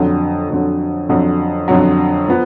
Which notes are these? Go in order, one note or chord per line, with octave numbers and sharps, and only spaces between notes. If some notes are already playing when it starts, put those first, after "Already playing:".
Already playing: F2 D3 F#3
F2 D3 F#3
F2 D3 F#3
F2 D3 F#3
F3 B3